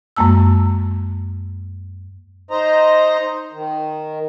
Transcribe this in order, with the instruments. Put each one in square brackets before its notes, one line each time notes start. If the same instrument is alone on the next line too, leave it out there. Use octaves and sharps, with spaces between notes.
[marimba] F#2 G#3 A#3 A5 E6
[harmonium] D#4 C5 D#5 A#5
D#3